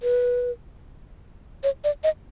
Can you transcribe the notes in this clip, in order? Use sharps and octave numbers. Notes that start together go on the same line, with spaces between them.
B4
C#5
D5
D#5